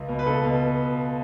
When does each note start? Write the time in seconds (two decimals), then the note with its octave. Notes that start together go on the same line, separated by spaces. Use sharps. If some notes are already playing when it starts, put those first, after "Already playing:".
Already playing: C#2
0.08 B2
0.19 B4
0.26 C#2 A4
0.45 B2